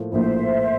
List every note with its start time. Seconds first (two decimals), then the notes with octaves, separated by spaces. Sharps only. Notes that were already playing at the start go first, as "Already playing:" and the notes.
Already playing: A2 F3 A#3 E4
0.12 A#1 A2 F3 A#3 E4 C5 E5